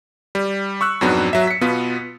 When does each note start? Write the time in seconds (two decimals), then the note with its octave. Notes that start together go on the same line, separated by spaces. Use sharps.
0.35 G3
0.81 C#6 E6 F#6
1.01 F2 G#2 F#3 B3 D4
1.33 F#3 E5
1.47 B6 C#7
1.61 B2 B3 F4 B6